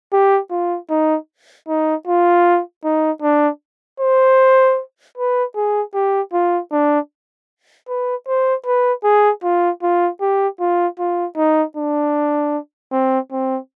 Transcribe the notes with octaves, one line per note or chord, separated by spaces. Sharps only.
G4
F4
D#4
D#4
F4
D#4
D4
C5
B4
G#4
G4
F4
D4
B4
C5
B4
G#4
F4
F4
G4
F4
F4
D#4
D4
C4
C4